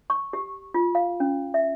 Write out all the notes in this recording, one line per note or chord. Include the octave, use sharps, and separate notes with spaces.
C#6
G4
F4
F5
C#4
E5